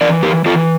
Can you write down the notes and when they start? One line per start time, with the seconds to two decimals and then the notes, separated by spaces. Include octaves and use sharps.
0.01 E3 A#4 D5
0.23 G4 A#4
0.45 E3 F4 A4